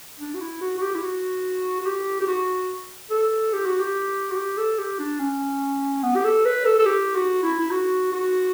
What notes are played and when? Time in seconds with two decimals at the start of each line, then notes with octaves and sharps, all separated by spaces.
0.19 D4
0.34 F#4
0.40 E4
0.61 F#4
0.78 F#4
0.82 G4
0.95 E4
1.02 F#4
1.80 F#4
1.86 G4
2.21 G4
2.27 F#4
3.10 A4
3.53 G4
3.65 F#4
3.79 G4
4.31 F#4
4.36 G4
4.58 A4
4.79 G4
4.99 D4
5.20 C#4
6.03 B3
6.16 G4
6.25 A4
6.45 B4
6.65 A4
6.79 A4
6.86 G4
7.15 F#4
7.42 E4
7.59 E4
7.71 F#4
8.12 F#4